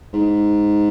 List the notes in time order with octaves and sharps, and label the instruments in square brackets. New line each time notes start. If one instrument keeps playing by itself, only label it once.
[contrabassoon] G#2